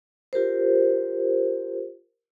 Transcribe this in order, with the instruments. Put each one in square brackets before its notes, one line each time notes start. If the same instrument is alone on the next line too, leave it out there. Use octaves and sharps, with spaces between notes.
[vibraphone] F4 G4 A#4 C5